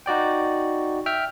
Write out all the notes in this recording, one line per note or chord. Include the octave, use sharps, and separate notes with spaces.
D#4 F#4 D5 G5
E5 G5 F6